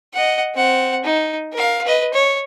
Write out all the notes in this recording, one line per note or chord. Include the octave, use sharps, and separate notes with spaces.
D#5 F#5
C4 F#5
D#4
A#4 F5
B4 D#5
C#5